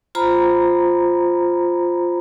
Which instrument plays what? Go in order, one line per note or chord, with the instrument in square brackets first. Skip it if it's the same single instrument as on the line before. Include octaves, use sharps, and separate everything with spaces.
[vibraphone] F4 C5 A#5 B5